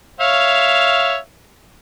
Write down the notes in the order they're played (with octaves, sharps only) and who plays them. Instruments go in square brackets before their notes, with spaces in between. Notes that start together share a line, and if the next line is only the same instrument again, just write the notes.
[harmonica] C#5 E5 F5